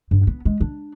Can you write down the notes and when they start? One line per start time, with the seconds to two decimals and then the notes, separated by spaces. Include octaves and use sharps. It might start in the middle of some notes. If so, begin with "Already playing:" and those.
0.11 G2
0.27 B3
0.45 G#3
0.61 D4